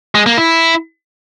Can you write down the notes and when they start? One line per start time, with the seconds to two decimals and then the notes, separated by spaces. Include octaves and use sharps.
0.15 G#3
0.26 A#3
0.38 E4